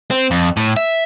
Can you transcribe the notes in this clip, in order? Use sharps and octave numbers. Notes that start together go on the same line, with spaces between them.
C4
F2
A2
E5